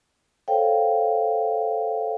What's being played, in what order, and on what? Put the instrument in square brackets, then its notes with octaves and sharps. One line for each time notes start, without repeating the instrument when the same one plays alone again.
[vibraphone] A4 C5 C#5 F5 G5